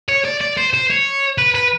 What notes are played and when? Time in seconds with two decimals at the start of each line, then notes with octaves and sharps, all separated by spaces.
0.09 C#5
0.25 D5
0.41 D5
0.57 C5
0.74 C5
0.90 C#5
1.38 B4
1.55 B4